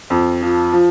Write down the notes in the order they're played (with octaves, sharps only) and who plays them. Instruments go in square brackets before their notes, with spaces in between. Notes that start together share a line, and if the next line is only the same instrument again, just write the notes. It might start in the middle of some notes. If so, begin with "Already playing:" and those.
[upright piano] F2
F3
F3